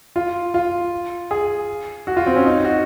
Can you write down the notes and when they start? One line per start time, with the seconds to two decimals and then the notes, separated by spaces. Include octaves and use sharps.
0.16 F4
0.54 F4
1.31 G#4
2.07 F#4
2.17 F4
2.26 C4
2.36 C#4
2.45 D#4
2.65 F#4